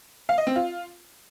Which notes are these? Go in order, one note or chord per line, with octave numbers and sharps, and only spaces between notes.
F5
D#5
C4
F4